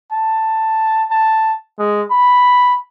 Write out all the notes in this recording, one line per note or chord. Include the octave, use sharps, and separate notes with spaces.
A5
A5
G#3
B5